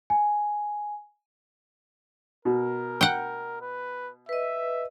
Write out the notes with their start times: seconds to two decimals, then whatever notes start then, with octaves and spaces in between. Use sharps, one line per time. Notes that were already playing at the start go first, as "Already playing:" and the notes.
0.10 G#5
2.45 B2 A#4
3.01 F#5 G5
3.62 B4
4.29 B4 D#5 E5